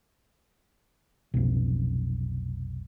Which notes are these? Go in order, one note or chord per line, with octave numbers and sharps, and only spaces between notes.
F1 B1